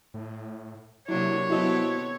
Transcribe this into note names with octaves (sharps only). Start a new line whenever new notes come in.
A2
C3 F#3 A#3 D4 E4 C#5
B3 C4 E4 F#4 A4 D#5